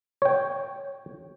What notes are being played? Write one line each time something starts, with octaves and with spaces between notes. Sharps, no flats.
C#5 G5